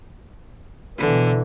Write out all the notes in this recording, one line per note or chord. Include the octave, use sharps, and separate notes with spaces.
B2 D3 E3